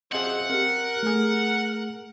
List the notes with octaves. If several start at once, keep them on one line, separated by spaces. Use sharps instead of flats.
F#2 F3 C4 G#4 D#5 E5 F#5
C4 G4 A#4
A3 G#4